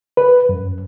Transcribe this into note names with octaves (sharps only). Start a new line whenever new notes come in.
B4
F#2